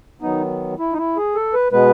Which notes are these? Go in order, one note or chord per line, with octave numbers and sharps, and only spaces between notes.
D#3 F#3 B3 D#4
E4
D#4
E4
G#4
A4
B4
B2 G#3 B3 B4